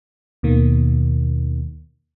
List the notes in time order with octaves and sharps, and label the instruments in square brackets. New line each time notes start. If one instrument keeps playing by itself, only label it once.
[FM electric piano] D#2 B2 D#3 A#3